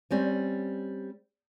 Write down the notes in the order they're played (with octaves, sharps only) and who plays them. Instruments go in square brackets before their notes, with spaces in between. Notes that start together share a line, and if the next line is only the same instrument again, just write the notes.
[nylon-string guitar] G3 C4 C#4